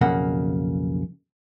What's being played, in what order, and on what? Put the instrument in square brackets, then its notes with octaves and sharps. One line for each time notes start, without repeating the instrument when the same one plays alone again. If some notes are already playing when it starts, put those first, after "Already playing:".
[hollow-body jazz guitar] B1 F2 C#3 A#3 F#5